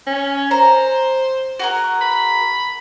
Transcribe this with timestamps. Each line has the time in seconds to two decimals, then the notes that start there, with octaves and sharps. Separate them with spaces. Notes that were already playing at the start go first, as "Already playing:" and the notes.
0.07 C#4
0.51 C5 A#5
1.59 F#4 G#4 A#4
2.01 B5